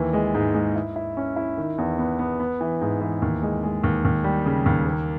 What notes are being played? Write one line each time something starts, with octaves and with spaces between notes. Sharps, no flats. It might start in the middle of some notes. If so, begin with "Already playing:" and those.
Already playing: D#2 E3
G#3
G#2
G#3
E4
E4
C#4
E4
D#3
E2
B3
B3
B3
E3
G#2
E3
D#2
G#3
G#3
D#2
D#2
G3
C#3
D#2
A#3